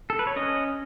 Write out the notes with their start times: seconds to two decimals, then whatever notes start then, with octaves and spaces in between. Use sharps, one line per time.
0.10 A4
0.19 B4
0.27 C#5
0.36 C#4 D#5